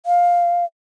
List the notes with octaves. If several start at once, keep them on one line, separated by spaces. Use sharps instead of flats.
F5